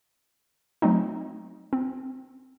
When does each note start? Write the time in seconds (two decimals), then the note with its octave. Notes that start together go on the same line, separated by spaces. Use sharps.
0.82 F#3 A3 C4 D#4
1.73 C4